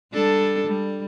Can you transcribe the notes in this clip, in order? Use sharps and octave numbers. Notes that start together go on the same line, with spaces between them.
G3 D4 A4
G3